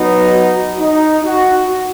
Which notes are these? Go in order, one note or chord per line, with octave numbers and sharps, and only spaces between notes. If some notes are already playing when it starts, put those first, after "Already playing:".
Already playing: F#3 B3 D#4
F#4
D#4
F#4